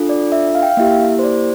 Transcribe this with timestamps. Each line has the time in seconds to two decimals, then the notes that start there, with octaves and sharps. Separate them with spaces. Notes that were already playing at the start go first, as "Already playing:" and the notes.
Already playing: D4 F4 A4
0.09 D5
0.32 E5
0.55 F5
0.63 G5
0.70 F5
0.77 A#3 E4 G4 E5
1.19 C5
1.24 D5